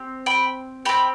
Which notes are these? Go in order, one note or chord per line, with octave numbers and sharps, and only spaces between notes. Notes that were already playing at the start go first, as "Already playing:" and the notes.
Already playing: C4 G4
G5 B5
C4 G4 G5 B5